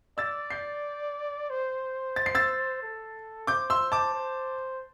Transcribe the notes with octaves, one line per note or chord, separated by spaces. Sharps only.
D5 E6 A6
G6 C7
C5
A6
C7
E6 A6
A4
C5 D6 G6
C6 E6
A5 D6
C5